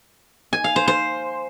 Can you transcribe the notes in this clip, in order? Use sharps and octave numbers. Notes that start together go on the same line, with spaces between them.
G#5
F5
C5
C5